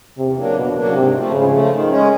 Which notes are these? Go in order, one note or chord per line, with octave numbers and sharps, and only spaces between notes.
E2 C3
C#3 F#3 A#3 D4
E2 B2
C#3 F#3 A#3 D4
G#2 C3
F3 A3
G#2 C#3
F3 A3
D#3
G#3 C#4